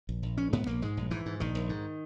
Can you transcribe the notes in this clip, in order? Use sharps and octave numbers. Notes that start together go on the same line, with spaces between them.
A#1
A#1
A#1 C#4
G#2 B3
A#1 A#3
G#2 G#3
A#1
G#2 E3
G#2
A#1 D#3
A#1
G#2